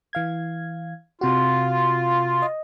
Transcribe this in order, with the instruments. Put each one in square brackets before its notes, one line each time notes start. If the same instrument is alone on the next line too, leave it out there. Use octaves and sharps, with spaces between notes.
[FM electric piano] E3 F5 G#6
[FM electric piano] C3 F#4 [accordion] F4
[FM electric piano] D#5